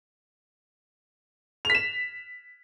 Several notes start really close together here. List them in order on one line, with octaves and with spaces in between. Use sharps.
F7 B6 E7